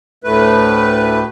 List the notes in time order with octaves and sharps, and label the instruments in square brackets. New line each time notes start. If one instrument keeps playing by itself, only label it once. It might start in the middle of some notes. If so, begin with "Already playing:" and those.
[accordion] D2 A2 A3 B4